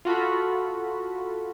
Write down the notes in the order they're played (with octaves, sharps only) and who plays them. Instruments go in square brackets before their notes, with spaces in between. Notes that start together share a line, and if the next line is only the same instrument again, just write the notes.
[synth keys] F4 F#4 A4 B5